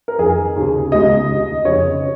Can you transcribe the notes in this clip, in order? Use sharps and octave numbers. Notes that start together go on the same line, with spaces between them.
A#4
F2 D#3 G#4
D#2 C#3
C#2 C#3 D#5
D#2 D#3
F2 C#3 C#5